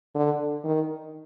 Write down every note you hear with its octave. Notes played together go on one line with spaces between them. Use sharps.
D3
D#3